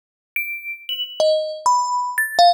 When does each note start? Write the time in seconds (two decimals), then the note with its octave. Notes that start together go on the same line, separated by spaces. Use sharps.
0.36 D7
0.89 F#7
1.20 D#5
1.66 B5
2.18 A6
2.39 F5